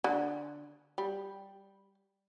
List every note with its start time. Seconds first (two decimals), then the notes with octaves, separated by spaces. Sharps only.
0.04 D3
0.98 G3